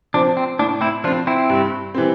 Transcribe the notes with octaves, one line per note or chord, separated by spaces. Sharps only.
F3 C4 D4
C4
A2 D4
C4 E4
F3 C4 D4 F4
C4 E4
G2
E3 G3 C4